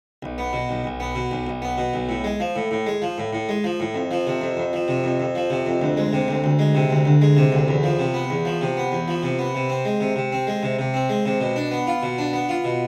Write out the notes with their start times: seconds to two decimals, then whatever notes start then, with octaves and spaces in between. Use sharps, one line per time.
0.23 B1
0.38 B3
0.53 B2
0.69 B1
0.84 B1
1.00 B3
1.16 B2
1.31 B1
1.47 B1
1.62 B3
1.78 B2
1.94 B1
2.09 A2
2.24 G#3
2.40 F3
2.56 A2
2.71 A2
2.87 G#3
3.02 F3
3.18 A2
3.33 A2
3.49 G#3
3.64 F3
3.80 A2
3.95 F2
4.11 F3
4.27 C3
4.41 F2
4.57 F2
4.73 F3
4.88 C3
5.04 F2
5.20 F2
5.35 F3
5.50 C3
5.66 F2
5.82 D2
5.97 G#3
6.13 C3
6.28 D2
6.44 D2
6.59 G#3
6.75 C3
6.90 D2
7.05 D2
7.22 G#3
7.37 C3
7.52 D2
7.68 E2
7.83 F3
7.99 C3
8.14 B3
8.30 E2
8.45 F3
8.61 C3
8.77 B3
8.92 E2
9.08 F3
9.23 C3
9.39 B3
9.55 C3
9.69 C4
9.85 G#3
10.00 C3
10.16 C3
10.32 C4
10.47 G#3
10.63 C3
10.79 C3
10.94 C4
11.09 G#3
11.26 C3
11.41 B2
11.56 D4
11.71 B3
11.87 F4
12.03 B2
12.18 D4
12.33 B3
12.49 F4
12.65 B2